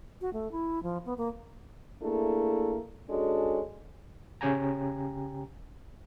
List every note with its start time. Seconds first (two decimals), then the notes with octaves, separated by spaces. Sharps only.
0.21 F#4
0.33 A3
0.52 E4
0.83 F3
1.06 B3
1.18 A#3
2.03 A3 A#3 D4 E4 G#4
3.09 G#3 C#4 D4 F#4 A4
4.41 C#3 C#4 G4 G5 G#5 A#5